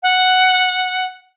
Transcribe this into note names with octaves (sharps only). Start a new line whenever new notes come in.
F#5